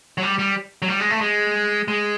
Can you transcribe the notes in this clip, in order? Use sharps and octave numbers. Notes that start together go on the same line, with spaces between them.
F#3
G3
G3
F#3
G3
G#3
A3
G#3
G#3